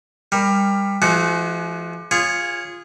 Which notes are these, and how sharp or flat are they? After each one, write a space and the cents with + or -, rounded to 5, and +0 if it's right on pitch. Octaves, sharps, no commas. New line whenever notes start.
G3 +20 A#4 +0
F3 -40 G#3 +40 F#4 +0
F4 +0 G#4 -20 C#5 +0